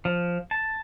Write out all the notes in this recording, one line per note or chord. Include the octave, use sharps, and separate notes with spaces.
F3
A5